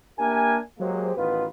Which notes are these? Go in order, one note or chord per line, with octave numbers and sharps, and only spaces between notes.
A#3 D4 G4 A#4 E5 G#5
F#3 G#3 A#3 G4 G#4 C5
A1 D#3 B3 F4 B4